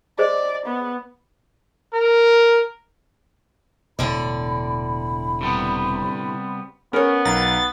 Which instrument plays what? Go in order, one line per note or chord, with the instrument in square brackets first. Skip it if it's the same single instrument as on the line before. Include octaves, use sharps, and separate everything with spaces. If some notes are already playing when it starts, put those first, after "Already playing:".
[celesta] G#4 C5 D#5 [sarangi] D5
[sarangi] B3
[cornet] A#4
[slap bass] E1 [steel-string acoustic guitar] A2 D3 D5 [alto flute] B5
[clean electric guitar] C3 G3 B3
[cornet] B3 [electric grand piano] C#4 [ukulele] A#4 C#5
[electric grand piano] B1 A#5 [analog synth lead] A6